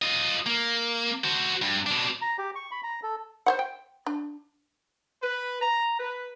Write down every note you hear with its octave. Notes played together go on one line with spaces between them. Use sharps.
F4 D#5
A#3
F#4 C5
G2
B2 D4
A#5
G4
C#6
B5
A#5
A4
C5 C#5 F#5
G5
D4
B4
A#5
B4